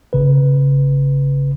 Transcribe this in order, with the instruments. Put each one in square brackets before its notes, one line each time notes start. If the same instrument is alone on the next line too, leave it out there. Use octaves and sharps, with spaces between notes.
[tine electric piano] G1 C#3 B4